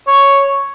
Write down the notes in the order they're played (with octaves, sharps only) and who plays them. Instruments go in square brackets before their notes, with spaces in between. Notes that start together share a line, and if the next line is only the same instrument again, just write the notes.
[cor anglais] C#5